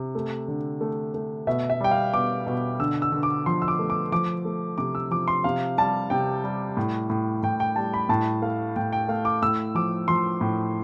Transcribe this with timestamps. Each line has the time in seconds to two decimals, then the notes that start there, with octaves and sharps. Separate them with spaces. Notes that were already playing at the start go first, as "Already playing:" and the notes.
Already playing: C3
0.15 A3
0.48 D3
0.81 A3
1.14 A3
1.47 B2 E5
1.70 E5
1.80 G3 G5
1.91 F5
2.14 B2 D6
2.46 B2
2.79 D3 E6
3.02 E6
3.12 D3
3.23 D6
3.46 F3 C6
3.62 E6
3.68 D6
3.79 A3
3.90 D6
4.12 F3 D6
4.45 A3
4.78 C3 D6
4.95 E6
5.11 F3 D6
5.28 C6
5.44 C3 F5
5.78 G3 A5
6.10 C3 G5
6.44 G3
6.77 A2
7.10 A2
7.43 A2 G5
7.60 G5
7.76 G3 A5
7.94 B5
8.09 A2 A5
8.42 A3 F5
8.76 A2 G5
8.93 G5
9.09 A3 F5
9.25 D6
9.42 A2 E6
9.75 F3 D6
10.08 F3 C6
10.41 A2